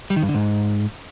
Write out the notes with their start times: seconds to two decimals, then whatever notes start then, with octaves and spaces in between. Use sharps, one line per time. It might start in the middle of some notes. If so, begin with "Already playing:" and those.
0.10 G3
0.16 D#3
0.22 G2
0.28 D3
0.35 G#2